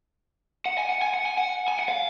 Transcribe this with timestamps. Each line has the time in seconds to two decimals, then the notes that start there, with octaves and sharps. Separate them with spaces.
0.66 F#5
0.78 G#5
0.89 F#5
1.02 G#5
1.14 F#5
1.26 G#5
1.38 F#5
1.68 G#5
1.79 F#5
1.89 F5